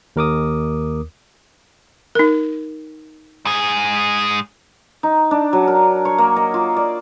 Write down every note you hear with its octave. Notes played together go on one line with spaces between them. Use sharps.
D#2 A#4 D6 D#6
D#4 A#4
G#2 G#4
D#4
D4
F#3
A#4
C#5
A#3
D#5
F4
D5